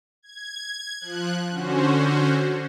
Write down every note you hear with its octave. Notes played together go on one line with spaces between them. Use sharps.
G#6
F3 F#6
D3 C#4 F#4 C5